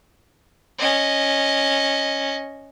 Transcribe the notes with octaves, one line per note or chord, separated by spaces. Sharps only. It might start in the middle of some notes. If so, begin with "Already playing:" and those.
C#4 D#5